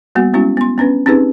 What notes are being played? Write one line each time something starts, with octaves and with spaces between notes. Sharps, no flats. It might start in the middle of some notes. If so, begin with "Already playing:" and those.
G3 A#3 B3 F#4
G#3 B3 C#4 E4 F#4
B3 C6
B3 C#4 D4 B4
C4 C#4 D#4 G4 G#4 B4